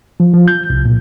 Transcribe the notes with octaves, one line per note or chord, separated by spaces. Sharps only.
F3
F3
G6
C2
A#2